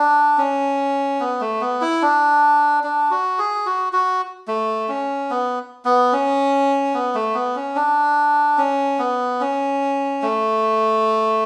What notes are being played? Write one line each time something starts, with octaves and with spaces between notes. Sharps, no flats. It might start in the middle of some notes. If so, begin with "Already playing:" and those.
Already playing: D4
C#4
B3
A3
B3
E4
D4
D4
F#4
G#4
F#4
F#4
A3
C#4
B3
B3
C#4
B3
A3
B3
C#4
D4
C#4
B3
C#4
A3